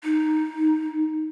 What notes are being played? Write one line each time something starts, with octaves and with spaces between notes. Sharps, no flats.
D#4